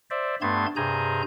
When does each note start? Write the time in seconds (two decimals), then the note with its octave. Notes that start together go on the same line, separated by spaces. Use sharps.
0.10 C5 D5 E5
0.42 G2 A3 B3 A5 C6 G#6
0.76 G2 C3 G#4 G#5 A#5 G6